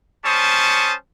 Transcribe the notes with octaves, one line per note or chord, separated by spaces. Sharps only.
G3 C#4 C5 A5 C#6 D#6